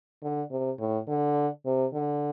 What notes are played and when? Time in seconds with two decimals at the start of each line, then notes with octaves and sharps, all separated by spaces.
0.22 D3
0.51 C3
0.79 A2
1.08 D3
1.66 C3
1.93 D3